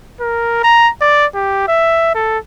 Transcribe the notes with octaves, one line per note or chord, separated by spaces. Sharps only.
A#4
A#5
D5
G4
E5
A4